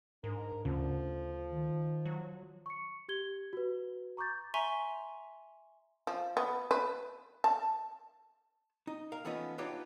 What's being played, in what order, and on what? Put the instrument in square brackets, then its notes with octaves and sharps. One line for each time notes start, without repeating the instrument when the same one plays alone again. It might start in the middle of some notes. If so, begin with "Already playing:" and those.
[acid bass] G#2 [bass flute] D4 [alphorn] A#4
[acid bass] D2 [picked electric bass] C#3 [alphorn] F3
[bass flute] D#3
[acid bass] F#3
[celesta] C#6 C#7
G4 G#6 G7
F#4 B4
A#5 C#6 D6 G6 A6
[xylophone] E5 G#5 A#5 C6 C#6
[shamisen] F3
B3
B4
A5
[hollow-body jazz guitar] D#4
A#4 F5
E3 A3 B3 C#4 D#4 F4
B3 D4 D#4 F4 G4 C#5